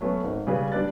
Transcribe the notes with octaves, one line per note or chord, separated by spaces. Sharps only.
F#3 A3 B3 C#4
G#1
C#3 G3 G#4 B4
G3 D4 B4 D5 F#6 A6